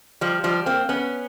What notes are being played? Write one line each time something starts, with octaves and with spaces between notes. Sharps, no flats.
F3 G3
F3 G3
A#3 C4
B3 C#4